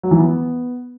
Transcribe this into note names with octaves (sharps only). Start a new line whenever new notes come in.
F#3
E3
B3